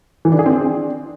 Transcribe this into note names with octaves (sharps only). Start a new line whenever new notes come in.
E3
D4
G#4
C4
D4